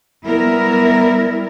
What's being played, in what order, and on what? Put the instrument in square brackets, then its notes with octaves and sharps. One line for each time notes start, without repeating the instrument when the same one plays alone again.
[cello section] G3 B3 E4 A#4